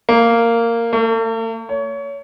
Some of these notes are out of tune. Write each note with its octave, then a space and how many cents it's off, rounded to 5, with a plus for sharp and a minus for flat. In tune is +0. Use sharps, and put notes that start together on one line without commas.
A#3 -10
A3 +45
C#5 +25